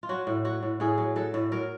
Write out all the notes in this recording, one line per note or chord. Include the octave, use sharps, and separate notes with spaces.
F4
F#3 F#4
A2
F#3 F#4
A2
A2 G#4
F#3
F#3 A4
A2
F#3 A#4